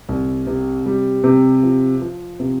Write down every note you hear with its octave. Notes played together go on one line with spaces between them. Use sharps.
C2
C3
G3
C3
F3
F3
C3